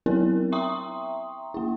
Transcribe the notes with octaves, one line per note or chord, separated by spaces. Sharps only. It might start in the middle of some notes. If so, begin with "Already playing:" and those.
F#3 B3 C4 E4 A#4 C#5
E5 G5 A#5 C6 C#6 D#6
A#3 E4